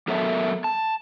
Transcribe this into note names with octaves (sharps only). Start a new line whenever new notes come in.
F#3 B3 A4 A#4 C#5 E5
A5